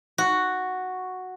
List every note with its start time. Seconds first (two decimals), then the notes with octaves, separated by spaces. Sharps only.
0.18 F#4